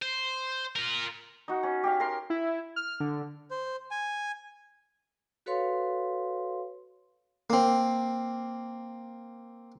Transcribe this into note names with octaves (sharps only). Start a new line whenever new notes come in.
C5
F4 A#4
D#4 F#4
C#4
G4 C#5 F5
A#4 C6
E4
F6
D3
C5
G#5
F#4 A4 B4 C#5 F5 C6
A#3 C4